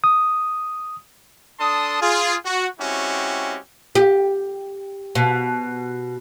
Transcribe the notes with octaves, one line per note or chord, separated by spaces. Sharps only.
D#6
D4 A4 A5 C6 D#6
F4 G#4
F#4
G#3 C4 C#4 E4 F#4 G4
G4
B2